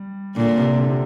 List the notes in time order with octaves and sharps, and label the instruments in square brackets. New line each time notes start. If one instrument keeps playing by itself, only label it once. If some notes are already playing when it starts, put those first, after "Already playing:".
Already playing: [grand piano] G3
[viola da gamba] A#2 [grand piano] D3
[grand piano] C3
D3
C3